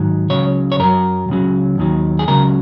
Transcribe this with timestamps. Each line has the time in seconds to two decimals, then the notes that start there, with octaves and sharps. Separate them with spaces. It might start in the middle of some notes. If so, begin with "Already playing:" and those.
Already playing: G#2 D#3 F#3
0.30 C#2 C#3 F#3 C#5
0.72 C#5
0.79 F#2 F#3 A#4
1.29 C#2 C#3 F#3
1.78 D#2 D#3 F#3
2.19 G#4
2.28 C#2 C#3 F#3 A#4